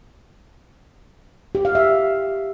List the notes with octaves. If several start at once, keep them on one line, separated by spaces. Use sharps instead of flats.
G4
F5
E5